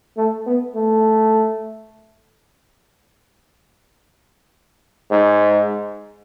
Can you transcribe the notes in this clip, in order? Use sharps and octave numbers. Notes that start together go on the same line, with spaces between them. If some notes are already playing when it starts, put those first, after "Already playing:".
A3
B3
A3
G#2